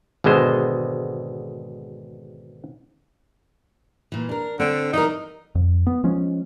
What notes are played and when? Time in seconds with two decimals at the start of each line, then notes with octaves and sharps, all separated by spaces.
0.24 G#1 B2 D3 G#3 C5
4.12 A#2 E3
4.29 D4 A#4
4.60 D3 C4 D4
4.93 E3 D#4 A#4
5.55 F2
5.87 B3
6.04 F3 G#3 C#4